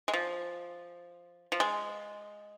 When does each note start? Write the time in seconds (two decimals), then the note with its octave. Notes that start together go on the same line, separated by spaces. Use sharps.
0.08 G#3
0.13 F3
1.52 F3
1.60 G#3